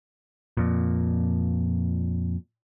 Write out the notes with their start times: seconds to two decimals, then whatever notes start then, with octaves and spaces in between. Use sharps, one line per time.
0.57 F2 A#2